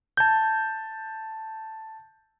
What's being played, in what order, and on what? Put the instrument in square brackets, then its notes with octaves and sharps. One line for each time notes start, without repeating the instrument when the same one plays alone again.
[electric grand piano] A5 G6